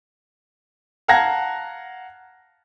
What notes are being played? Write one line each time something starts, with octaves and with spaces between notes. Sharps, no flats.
F5 F#5 A5 A#5 G#6 A#6